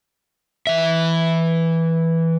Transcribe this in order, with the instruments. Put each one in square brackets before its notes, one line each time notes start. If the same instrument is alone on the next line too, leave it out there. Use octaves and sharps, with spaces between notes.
[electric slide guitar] E3 E5